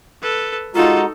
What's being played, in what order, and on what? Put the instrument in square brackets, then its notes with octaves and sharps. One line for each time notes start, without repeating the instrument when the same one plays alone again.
[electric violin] A4 B4
[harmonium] G#3 F#4 A#5 [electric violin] D#4 A4 [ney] F4